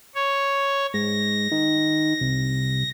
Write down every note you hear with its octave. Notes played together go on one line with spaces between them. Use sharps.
C#5
G#2 A#6
D#3
C2